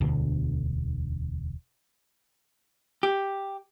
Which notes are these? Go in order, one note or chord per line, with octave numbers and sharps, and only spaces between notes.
E1 D2 B2 D3
G4